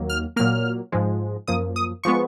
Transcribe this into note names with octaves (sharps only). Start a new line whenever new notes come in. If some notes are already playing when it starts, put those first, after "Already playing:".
Already playing: D#2 D#3 F#3 A#3
F6
A#2 F#3 A#3 F6
G#2 F3 G#3
F#2 F3 A#3 D#6
D#6
F3 G#3 B3 C#6